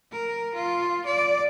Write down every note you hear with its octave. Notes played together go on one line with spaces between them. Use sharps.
A#4
F4
D5